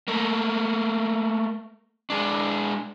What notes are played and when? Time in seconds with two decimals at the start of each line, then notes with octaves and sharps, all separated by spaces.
0.08 A3 A#3
2.10 G#3 D4